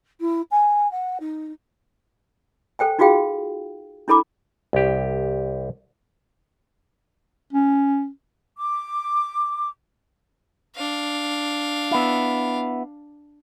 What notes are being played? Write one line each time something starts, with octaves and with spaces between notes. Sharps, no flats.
E4
G#5
F#5
D#4
A4 C5 G5 G#5
D#4 F4 F#4 G#4 F5 G5
D4 E4 A4 B5 D6
C2 G4
C#4
D6
D4 F5
B3 E4